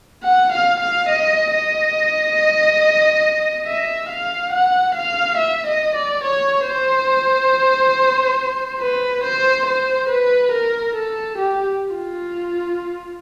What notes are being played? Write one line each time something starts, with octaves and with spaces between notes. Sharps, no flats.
F#5
F5
F5
D#5
D#5
E5
F5
F#5
F5
E5
D#5
D5
C#5
C5
B4
C5
C5
B4
A#4
A4
G4
F4